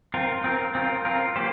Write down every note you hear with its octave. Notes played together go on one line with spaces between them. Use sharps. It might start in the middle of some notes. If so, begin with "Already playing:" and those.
C4 F4 A#4
C4 F4 A#4
C4 F4 A#4
C4 F4 A#4
A#3 G4 C5